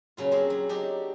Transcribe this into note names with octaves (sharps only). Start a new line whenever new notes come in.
A#2 C#3 F#3 F4
C4 D4 F#4 G#4 A#4 C5
F#3
D4 D#4 F#4 G4